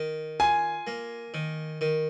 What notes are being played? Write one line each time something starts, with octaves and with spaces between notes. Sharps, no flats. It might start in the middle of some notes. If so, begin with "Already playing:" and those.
Already playing: D#3
F4 G#5
A#3
D#3
D#3